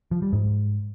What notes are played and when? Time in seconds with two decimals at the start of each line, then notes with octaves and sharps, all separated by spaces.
0.11 F3
0.22 G3
0.33 G#2